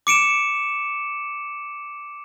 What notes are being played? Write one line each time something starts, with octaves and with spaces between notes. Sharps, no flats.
D6 C#7 D7 E7